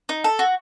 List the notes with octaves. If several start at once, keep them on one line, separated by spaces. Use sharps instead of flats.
D#4
A4
F#4